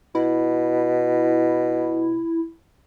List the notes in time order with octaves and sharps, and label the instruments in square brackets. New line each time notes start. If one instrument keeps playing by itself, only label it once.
[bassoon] B2 [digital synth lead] E4